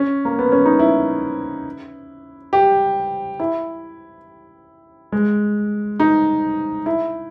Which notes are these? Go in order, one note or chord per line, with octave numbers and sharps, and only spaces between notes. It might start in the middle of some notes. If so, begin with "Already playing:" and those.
Already playing: C#4
A#3
B3
C#4
D#4
E4
G4
E4
G#3
D#4
E4